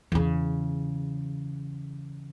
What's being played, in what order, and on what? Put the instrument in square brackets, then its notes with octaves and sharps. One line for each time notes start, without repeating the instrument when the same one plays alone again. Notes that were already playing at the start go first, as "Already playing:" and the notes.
[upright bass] E2 C#3